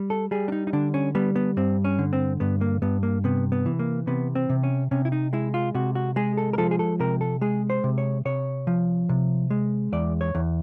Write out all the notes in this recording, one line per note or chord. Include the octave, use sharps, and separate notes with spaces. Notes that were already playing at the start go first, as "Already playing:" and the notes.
Already playing: G3
A4
G3 G#4
D4
D#4
D#4
D3 D4
C#4
G3 B3
B3
G2 C4
C#4
D3
C4
G2 B3
A#3
G2 B3
A#3
C3 B3
B3
E3
A#3
C3 B3
C4
C3
C#4
C3 C#4
E4
D#4
G#3 E4
F4
C3 F#4
F#4
G#3 G#4
A4
A#4
F3 A4
G#4
A4
C3 A#4
A4
G#3 G#4
C5
C3
C#5
C3 C#5
F3
C3
G#3
E2 D5
C#5
E2